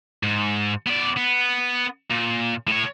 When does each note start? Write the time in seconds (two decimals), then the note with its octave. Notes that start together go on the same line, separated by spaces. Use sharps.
0.23 G#2
0.86 B3 D5
1.17 B3
2.11 A#2
2.67 A2 C#5